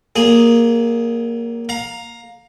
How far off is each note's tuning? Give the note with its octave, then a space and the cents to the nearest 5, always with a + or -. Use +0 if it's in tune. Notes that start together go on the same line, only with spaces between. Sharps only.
F#3 +35 A#3 +0 G#4 +0
F5 +20 A#5 +0